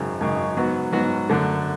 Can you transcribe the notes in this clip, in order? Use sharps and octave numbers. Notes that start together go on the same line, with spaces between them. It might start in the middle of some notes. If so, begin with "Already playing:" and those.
Already playing: G#1 F#2 C#3 G#3
G#1 F#2 C#3 G#3
G#2 F#3 B3 F#4
G#2 F#3 B3 F#4
F#2 D3 A3